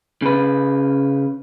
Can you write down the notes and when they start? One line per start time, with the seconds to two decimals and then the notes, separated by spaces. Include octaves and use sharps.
0.22 C#3 B4